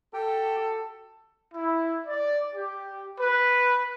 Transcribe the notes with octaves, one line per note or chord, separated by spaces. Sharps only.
F#4 G4 A4 G5
E4
D5
G4
B4